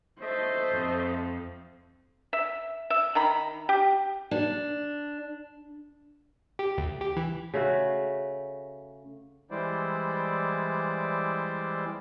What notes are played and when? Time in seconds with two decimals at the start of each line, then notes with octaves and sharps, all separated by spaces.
0.22 A3 C5 D#5
0.71 F2
2.33 E5
2.90 E5
3.15 D#3 A#5 B5
3.69 G4
4.31 D4
6.59 G4
6.78 D2
7.01 G4
7.17 E3
7.54 C#3 A3 F#4
9.51 E3 G3 G#3 E4 C5 D5